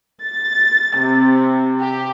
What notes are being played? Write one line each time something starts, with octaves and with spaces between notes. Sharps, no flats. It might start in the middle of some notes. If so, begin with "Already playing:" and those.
A6
C3
G4